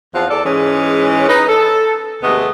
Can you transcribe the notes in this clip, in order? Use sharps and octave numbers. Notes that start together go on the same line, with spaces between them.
E2 F3 C4 F4 F5 F#5
E2 A4 D5
G#2 E3 G#3 C#4
D#4 B4
A4
D#2 C3 G#3 A3 B3